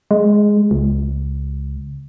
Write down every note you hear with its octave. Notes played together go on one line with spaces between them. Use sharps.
G#3
C#2